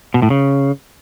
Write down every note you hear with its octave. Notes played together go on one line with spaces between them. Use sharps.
B2
A2
C#3